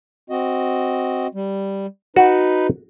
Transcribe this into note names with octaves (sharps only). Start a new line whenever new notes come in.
C4 F#4 D#5
G3
D#4 F#4 B4